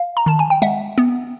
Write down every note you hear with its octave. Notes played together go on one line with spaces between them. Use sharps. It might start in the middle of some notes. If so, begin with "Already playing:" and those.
Already playing: F5
A#5
D#3 A5
G#5
G5
G#3 E5 F#5
B3